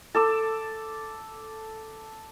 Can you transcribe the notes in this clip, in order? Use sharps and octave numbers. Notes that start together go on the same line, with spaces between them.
A4 D6 E6